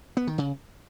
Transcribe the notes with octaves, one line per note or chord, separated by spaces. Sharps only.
B3
D#3
C#3